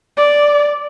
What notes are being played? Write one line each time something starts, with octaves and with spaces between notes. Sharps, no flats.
D5